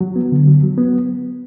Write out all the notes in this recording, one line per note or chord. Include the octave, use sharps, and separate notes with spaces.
F#3
B3
D3
F#3
F#3
B3